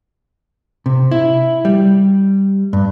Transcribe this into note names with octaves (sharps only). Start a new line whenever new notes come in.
C3
E4
G3
G2